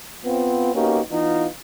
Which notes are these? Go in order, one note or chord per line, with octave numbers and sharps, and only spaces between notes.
B3 C4 F4
A#3 B3 C#4 D#4 F#4 G4
E3 B3 D#4 F4